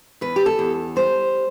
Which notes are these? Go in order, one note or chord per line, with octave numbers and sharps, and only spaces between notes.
E2 B4
G4
A4
E2
G3 C5